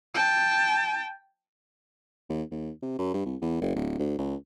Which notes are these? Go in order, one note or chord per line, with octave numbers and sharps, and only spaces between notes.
G5 A5
D#2
D#2
C3
F#2
G2
C2
E2
F#1
D1
D2
C#2